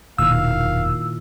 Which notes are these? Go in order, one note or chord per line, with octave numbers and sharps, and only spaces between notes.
E1 F#2 A#2 D#3 E4 F5 E6